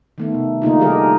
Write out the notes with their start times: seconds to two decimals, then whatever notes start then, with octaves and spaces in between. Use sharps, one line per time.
0.18 D#3 A3 B3
0.34 C3
0.62 D3 A#3 D#4 F4
0.79 D#3 G3 G4 G#4 A#4